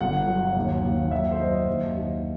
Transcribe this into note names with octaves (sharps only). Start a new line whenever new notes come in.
G1 F#5
F#3
D#2
D#2
F#2 E5
C5
F#3 D#5
D#2
D#2